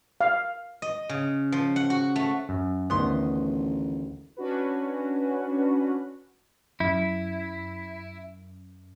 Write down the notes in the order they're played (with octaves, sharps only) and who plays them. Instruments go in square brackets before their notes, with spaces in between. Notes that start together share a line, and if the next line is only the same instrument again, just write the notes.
[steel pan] F5
[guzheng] D#5
C#3
F3
F#5
F#4
A3
[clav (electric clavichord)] F#2
[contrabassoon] A1 [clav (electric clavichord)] D2 D#3 B3 [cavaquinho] C6 D#6
[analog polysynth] C#4 D4 F#4 B4
[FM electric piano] F#2 [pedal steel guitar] E4